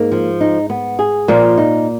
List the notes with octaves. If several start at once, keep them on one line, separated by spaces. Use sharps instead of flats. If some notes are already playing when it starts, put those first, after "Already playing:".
Already playing: G#2 A#3
F3
D#4
B3
G#4
A#2 F3 A#3
D#4